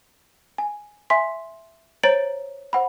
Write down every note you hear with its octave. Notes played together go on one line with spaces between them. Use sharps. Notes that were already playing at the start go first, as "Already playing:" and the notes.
G#5
E5 G#5 C6 B6
C5 C#5 A#5 A6 D7 F#7
C5 F#5 B5